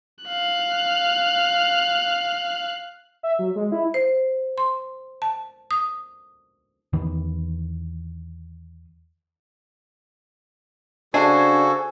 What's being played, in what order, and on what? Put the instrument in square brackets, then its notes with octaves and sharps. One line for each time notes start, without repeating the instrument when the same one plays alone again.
[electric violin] F5 F#6
[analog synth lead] E5
F#3
G#3
E4
[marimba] C5
C6
A5
D#6
[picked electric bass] E2 D#3 E3
[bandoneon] C#3 F#4 A4 [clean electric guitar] D4 [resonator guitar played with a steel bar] C5 [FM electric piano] G#5